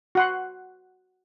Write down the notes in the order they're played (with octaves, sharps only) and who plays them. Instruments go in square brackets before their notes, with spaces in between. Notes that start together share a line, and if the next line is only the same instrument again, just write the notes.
[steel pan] F#4 F#5 C6